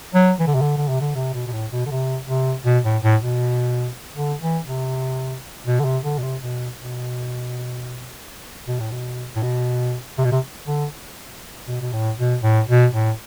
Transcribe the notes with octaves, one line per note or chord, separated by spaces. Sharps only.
F#3
E3
D3
C3
D3
D3
C3
D3
C3
B2
B2
A2
B2
D3
C3
C3
B2
A2
A2
B2
D3
E3
C3
B2
D3
C3
D3
B2
C3
B2
B2
B2
A2
B2
A2
B2
C3
B2
C3
D3
B2
B2
A2
B2
A2
B2
A2